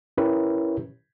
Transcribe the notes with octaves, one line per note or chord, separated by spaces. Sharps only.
C#4 E4 G4 A#4 B4 C#5